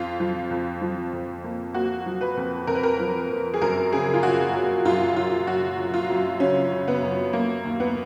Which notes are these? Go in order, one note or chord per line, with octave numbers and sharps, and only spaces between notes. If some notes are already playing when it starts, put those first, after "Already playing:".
Already playing: F2 F4
F3
F2
F3
F2
A#3
A#3 F#4
F3
B4
F2
F2 A#4
B4
A#4
F3
F2
G#4
F#2 A#4
C#3 G#4
F4
F#3 F#4
F#3
F#2 F4
F#3 F4
F#3 F#4
F#3
F4
F#2
C#3 C#4
C#3
B3
F#2
A#3
D#2
B3